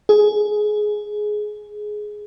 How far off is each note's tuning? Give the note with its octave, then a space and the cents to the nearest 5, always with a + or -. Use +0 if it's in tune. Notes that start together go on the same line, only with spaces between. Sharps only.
G#4 +15